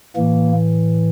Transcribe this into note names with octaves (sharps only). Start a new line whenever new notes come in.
A2 E3 A#3